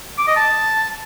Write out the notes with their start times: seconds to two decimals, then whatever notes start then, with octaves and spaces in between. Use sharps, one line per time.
0.18 D6
0.27 D#5
0.36 A5